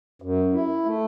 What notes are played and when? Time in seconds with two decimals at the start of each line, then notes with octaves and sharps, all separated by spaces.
0.22 F#2
0.54 E4
0.85 A3